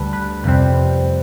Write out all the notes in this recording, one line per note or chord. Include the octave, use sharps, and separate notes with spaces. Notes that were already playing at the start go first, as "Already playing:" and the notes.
Already playing: D2 D3 G3 A4 B4
B4
F2 C3 G3 C4 B4